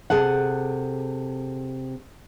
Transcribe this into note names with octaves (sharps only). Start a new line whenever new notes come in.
C3 G#4 A4 F#5